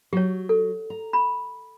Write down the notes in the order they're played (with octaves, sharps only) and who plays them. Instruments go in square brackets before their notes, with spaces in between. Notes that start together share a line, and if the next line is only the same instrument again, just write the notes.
[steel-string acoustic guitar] F#3 [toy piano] G4 C#5
[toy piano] A4
[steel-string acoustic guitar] A#5
[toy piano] B5